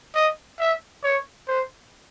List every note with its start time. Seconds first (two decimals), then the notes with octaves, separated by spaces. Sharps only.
0.15 D#5
0.60 E5
1.03 C#5
1.48 C5